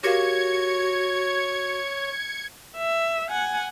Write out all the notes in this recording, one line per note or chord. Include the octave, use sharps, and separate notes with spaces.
F#4 G4 A#4 C#5 F5 G#6 C#7
E5
F#5 G#5